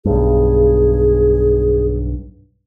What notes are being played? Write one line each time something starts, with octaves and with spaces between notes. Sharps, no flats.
B1 G2 G#4